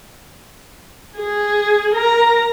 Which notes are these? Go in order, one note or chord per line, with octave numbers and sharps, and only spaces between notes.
G#4
A#4 A#5